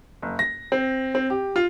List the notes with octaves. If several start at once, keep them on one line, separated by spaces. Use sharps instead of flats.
F#1
A#6
C4
C4
G4
F4